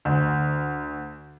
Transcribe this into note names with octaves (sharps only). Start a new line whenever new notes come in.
D2